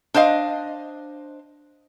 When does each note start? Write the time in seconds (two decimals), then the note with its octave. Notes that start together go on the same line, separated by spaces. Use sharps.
0.14 D4 C5 D#5 F5